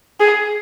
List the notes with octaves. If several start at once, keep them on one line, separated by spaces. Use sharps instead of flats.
G#4